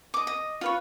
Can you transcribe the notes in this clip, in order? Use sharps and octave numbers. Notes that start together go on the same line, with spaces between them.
D#5 D6
D#5
F4 B4 C#5